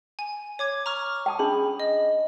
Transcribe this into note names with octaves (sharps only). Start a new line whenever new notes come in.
G#5
C#5 D6 G#6
A#5 C#6 F6
G5 A5 D#6
C#4 D4 G#4 B5
D#5